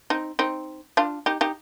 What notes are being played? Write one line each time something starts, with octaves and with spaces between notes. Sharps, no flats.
C4 D#4
C4 D#4
D4 F4
D#4 G4
D#4 G4